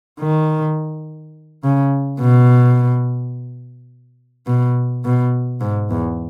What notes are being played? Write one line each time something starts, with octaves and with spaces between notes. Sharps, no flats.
D#3
C#3
B2
B2
B2
G#2
E2